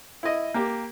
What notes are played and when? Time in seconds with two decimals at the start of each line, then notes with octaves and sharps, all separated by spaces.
0.23 E4 D#5
0.54 A#3 G4